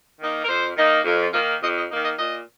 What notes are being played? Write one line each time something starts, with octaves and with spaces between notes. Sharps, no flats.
D#3 A#3 D#4
A#4
F2 C5
D#3 A#3 D#4
F2
F4
D#3 A#3 D#4 F4
F2 D#5
D#5
D#3 A#3 D#4
D#5
A#2 D#5